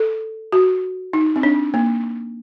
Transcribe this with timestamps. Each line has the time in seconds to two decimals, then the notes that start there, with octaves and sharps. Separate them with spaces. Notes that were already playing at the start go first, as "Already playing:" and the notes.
Already playing: A4
0.52 F#4
1.13 D#4
1.36 C4
1.43 D4
1.74 A#3